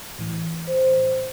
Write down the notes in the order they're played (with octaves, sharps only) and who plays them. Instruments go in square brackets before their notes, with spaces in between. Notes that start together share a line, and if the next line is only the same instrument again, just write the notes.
[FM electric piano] A2 E3
[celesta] C5